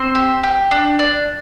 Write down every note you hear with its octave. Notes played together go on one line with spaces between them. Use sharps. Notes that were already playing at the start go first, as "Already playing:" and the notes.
Already playing: C4 C5
G4
G4
D4
D4